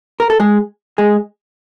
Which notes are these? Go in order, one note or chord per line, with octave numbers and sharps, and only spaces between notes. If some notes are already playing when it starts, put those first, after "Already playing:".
A#4
A4
G#3 G#4
G#3 G#4